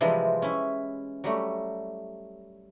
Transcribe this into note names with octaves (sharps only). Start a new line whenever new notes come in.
C3 E3 F3 G3 G#3 C4
C#4 E4
F#3 G3 A3